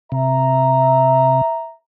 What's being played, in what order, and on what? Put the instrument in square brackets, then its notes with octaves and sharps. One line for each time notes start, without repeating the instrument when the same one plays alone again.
[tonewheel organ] C3 [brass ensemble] E5 A#5